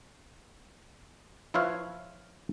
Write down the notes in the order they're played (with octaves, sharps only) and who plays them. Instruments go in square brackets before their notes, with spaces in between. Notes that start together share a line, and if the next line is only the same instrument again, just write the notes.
[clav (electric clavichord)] F3 E4 F4 B4 C#5 F5